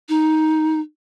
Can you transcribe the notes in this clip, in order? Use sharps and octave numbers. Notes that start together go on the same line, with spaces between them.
D#4